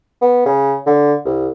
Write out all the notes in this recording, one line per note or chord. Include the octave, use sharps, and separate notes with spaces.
B3
C#3
D3
C2